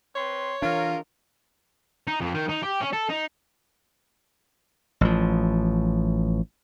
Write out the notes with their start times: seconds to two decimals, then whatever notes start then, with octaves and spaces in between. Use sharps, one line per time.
0.16 C4 B4 C#5 C6
0.62 E3 D4 F4 A#4
2.07 D#4
2.21 F2
2.35 D#3
2.49 D#4
2.63 G4
2.81 C#4
2.93 A4
3.10 D#4
5.01 A1 F3